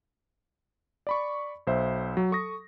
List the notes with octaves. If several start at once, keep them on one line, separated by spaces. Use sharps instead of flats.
D5 B5 C#6
B1 C5 E5
F#3
A4 C#6 D#6 A#6